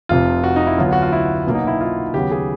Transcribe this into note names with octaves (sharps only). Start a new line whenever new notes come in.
F1 F2 C3 F4
F#4
D#4
E4
D2 D3 F#3 B3 F4
F#4
F4
E4
B1 B2 F#3 A#3
D#4
E4
F4
D#2 C#3 F#3 B3 G4
G#4